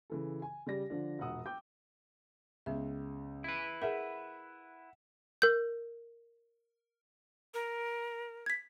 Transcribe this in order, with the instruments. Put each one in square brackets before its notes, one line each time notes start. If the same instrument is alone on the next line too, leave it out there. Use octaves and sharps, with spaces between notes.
[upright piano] C#3 E3 A4
G#5
C#3 G3 D5 A#6
D3 F3 D4
E1 A#1 F#5 D#6 E6
G5 D6 G6
[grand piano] C#2 [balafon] B3 E5
[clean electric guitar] E4 B4
[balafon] G#4 A#4 [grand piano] E5 F#5
[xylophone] A#4 G6
[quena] A#4
[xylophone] G#6 B6